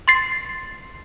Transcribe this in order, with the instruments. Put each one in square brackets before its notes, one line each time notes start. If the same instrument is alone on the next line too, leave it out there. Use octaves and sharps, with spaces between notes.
[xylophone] C6 A6 C7